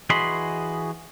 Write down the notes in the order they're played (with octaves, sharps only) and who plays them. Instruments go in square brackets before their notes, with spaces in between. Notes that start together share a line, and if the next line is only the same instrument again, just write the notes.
[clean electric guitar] E3 F#4 G#4 D#5 B5 C6